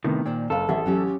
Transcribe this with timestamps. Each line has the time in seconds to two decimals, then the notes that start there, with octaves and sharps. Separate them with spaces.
0.04 A2 C3 D#3 B3
0.26 A#2 C5 D5 G5
0.50 F#1 A4 F5
0.69 A1 G#4 E5
0.86 F#3 C#4 G4